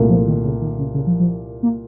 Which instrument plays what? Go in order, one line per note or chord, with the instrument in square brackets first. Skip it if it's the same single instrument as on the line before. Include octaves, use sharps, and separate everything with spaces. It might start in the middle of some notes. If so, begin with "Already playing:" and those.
Already playing: [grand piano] C2 A#2 A3
[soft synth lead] F3
D#3
C#3
D#3
C#3
C#3
F3
F3
A#3